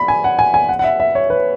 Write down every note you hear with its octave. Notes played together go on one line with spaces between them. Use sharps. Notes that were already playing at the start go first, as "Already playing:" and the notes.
Already playing: B5
G#5
F#5
G#5
G#5
F#5
F#5
E5
E5
C#5
B4